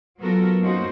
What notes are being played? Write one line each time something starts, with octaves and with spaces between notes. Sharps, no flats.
F#3 B3 F4 F#4 A4 A#4
F#2 A#3 C#4 D#4 F#4 C5